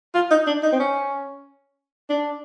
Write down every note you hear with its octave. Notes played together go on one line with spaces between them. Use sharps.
F4
D#4
D4
D#4
C4
C#4
D4